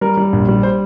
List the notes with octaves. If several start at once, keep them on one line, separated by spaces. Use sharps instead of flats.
G3 A#4
G3
A#1
G3
C5